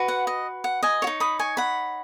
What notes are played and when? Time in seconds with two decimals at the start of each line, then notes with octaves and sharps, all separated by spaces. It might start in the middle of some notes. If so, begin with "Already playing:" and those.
Already playing: F#4 B4
0.08 F#5
0.27 D#5
0.64 F#5
0.83 D#5 G#5
1.02 F#4 C#5
1.07 D#4
1.20 B5 D#6
1.39 G#5 C#6
1.57 F#5 B5